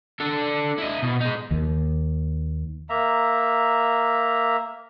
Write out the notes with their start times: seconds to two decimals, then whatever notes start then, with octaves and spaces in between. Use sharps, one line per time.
0.20 D4 A4
0.78 E4 D#5
1.02 B2
1.20 G#3 D#4
1.51 D#2
2.90 A#3 E5 A#5